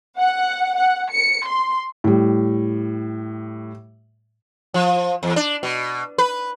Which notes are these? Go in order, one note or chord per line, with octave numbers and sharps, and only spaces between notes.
F#5
F#5
C#7
C6
A2 G3
F3
E2
D4
B2
B4